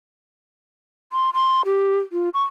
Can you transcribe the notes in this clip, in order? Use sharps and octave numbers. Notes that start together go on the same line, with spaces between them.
C6
C6
G4
F4
C#6